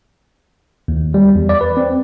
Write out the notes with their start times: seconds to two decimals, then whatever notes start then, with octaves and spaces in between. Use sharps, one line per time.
0.88 D#2
1.14 G3
1.35 E2
1.49 D5
1.61 B4
1.77 C4